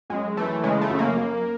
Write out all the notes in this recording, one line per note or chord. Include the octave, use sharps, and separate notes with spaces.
F#2 G#3
E3 A3
C#3 G#3
A3
F#2
A#3
F#2